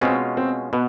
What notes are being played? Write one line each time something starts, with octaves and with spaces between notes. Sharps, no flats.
B2 G#3 C4 C#4 F4
C4
B2 B3